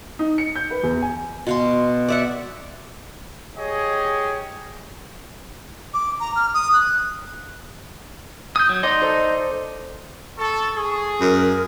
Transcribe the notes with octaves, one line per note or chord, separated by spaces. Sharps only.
D#4
C#7
G6
B4
E2
G#5
B2 F5 C6
D5 E5 F#5
G4 G#4 C#5 D#5
D6
A#5
F6
D#6
F#6
D#6 G6
F#3
D#4 D5 D#5 C6
A4 C5
A4 C#6
G#4
F#2 A#4